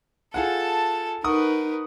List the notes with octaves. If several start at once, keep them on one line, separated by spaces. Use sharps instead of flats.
F4 G#4 A4 F#5 A5
D#4 A#4 B4 F#5 C#6 D#6